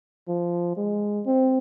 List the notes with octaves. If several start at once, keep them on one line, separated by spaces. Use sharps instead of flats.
F3
G#3
C4